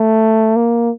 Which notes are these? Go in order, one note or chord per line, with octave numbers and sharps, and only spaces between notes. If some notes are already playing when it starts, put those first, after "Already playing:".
Already playing: A3
A#3